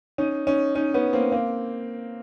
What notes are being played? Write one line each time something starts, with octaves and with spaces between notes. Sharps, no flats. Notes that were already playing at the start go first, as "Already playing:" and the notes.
C#4 D#4
C#4 D#4
C#4 D#4
B3 C#4
A#3 C4
A#3 C4